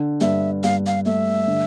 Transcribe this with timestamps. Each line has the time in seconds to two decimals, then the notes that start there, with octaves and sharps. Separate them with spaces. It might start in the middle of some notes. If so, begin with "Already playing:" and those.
Already playing: D3
0.21 G2 E5
0.64 G2 F5
0.87 F5
1.06 A3 E5
1.47 D3